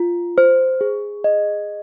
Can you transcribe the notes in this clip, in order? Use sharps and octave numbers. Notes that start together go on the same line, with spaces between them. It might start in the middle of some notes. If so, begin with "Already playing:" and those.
Already playing: F4
C5
G#4
D#5